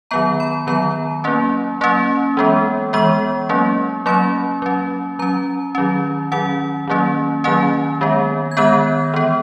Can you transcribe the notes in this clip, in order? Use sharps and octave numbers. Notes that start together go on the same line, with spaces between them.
D#3 F#3 B3 A#5
B5
D#3 F#3 B3 A#5
F#3 A#3 C#4
F#3 A#3 C#4
E3 G#3 B3
E3 G#3 B3 C#6
F#3 A#3 C#4
F#3 A#3 C#4 B5
F#3 C#4
F#3 C#4 A#5
D#3 F#3 C#4
D#3 F#3 C#4 F#5
D#3 F#3 A#3 C#4
D#3 F#3 A#3 C#4 G#5
D#3 G#3 B3
G#6
D#3 G#3 B3 F#6
E3 B3